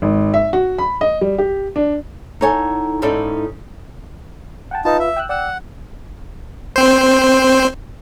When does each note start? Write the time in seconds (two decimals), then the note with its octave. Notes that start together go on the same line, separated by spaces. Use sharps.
0.02 G#1
0.34 E5
0.53 F#4
0.78 B5
1.01 D#5
1.21 G3
1.38 G4
1.76 D4
2.41 D#4 E4 A4 C#5 F#5 G#5
3.02 G#2 C#4 D#4 E4 A4 D5
4.71 F#5 G5 A5
4.85 D#4 F4 B4 F5 A5
5.00 E5
5.16 G5 E6 F#6
5.29 D5 F#5 G5 E6
6.76 C4 C5